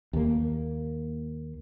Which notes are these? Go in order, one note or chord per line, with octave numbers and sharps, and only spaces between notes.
D#2 A#3